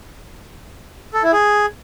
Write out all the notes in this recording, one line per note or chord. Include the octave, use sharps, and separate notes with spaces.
A4
E4
G#4